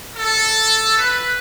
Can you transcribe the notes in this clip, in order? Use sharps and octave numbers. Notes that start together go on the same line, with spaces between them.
A4
B4